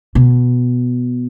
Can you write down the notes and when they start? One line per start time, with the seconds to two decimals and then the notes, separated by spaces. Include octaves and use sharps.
0.15 B2